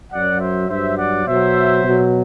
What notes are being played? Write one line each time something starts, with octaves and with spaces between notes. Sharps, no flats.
F#2 F#3 D5 F#5
C5 E5
G2 F#3 C5 E5
D5 F#5
B2 F#3 C5 E5
B2 F#3